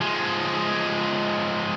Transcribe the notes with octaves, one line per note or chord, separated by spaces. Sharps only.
F3 G#3